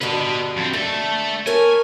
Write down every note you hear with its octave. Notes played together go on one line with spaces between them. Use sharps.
G2 B2 D3 B4 D#5
F2 C4
D3 A3 A4
A4 A#4 C#5 G#5